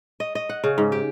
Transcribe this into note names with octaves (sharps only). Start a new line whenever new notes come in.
D#5
D#5
F#5
C#3
G#2
G4